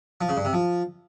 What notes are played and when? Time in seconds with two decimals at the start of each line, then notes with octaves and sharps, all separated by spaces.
0.21 F3
0.29 C#3
0.37 G2
0.45 C3
0.53 F3